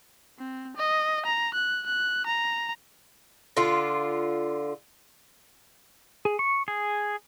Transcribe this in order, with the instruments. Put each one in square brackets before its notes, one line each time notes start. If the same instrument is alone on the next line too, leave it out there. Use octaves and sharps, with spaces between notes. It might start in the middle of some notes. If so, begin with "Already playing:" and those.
[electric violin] C4
D#5
A#5
F#6
F#6
A#5
[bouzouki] D3 F4
[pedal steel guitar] G#4
C#6
G#4